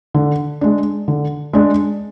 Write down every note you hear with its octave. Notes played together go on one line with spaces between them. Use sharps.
D3
G#3 D4
D3
G#3 D4